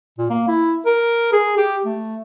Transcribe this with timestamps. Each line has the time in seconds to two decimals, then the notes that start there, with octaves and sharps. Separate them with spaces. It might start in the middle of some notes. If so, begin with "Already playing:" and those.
0.18 A#2
0.30 A#3
0.48 E4
0.86 A#4
1.33 G#4
1.57 G4
1.85 A3